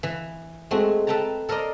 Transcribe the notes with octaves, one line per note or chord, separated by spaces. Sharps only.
E3
G#3 A3 C4 F#4
A4 B4 G5 A5 A#5
A4 A#4 C5 D5 D#5